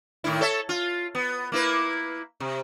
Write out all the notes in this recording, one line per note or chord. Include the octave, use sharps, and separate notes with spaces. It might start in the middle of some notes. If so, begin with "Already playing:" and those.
A2 D#3 E4
A4 C#5 E5
F4
B3
A#3 E4 B4
C3